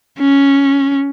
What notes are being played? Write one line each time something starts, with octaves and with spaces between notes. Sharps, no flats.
C#4